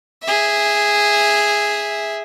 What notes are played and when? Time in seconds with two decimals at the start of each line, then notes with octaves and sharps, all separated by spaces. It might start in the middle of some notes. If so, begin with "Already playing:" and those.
0.23 G#4 E5